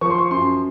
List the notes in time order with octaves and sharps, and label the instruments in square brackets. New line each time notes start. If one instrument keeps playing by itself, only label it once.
[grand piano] F3 C#6
C6
C#6
F#2 C6